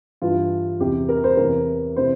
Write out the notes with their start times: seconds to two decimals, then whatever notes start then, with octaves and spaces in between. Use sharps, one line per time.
0.22 G2 E3 F4
0.79 E2 C3 E3 G4
1.09 A#4
1.24 C5
1.37 E2 C3 E3 A#4
1.96 C3 E3 C5